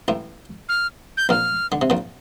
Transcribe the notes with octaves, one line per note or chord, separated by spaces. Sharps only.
A1 A2
F6
G6
A#1 A#2 F6
D3
C3
A#1 A#2